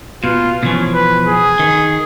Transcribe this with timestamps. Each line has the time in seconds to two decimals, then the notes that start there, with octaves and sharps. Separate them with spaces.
0.24 B2 F4
0.63 B2 E3 F3 C#4
0.93 B4
1.26 G#4
1.59 D#3